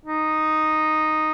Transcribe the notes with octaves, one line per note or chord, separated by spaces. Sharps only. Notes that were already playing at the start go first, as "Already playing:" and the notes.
D#4